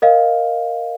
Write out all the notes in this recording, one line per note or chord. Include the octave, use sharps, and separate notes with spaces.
A#4 D#5 F5